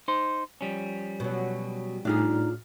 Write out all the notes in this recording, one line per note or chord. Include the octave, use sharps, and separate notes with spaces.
D#4 C5
F3 G3 C#4
B2 F#3
A2 D4 D#4 F4 G#4 F6